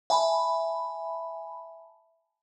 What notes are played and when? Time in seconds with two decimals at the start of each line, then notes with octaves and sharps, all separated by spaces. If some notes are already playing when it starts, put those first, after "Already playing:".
0.10 E5 G#5 A5 B5